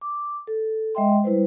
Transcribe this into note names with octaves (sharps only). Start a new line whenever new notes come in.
D6
A4
G#3 D#5 E5 G5 C6
G3 E4 B4 C5